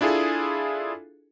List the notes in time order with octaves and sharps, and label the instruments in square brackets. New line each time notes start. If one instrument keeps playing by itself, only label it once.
[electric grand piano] D4 E4 F4 G#4 A4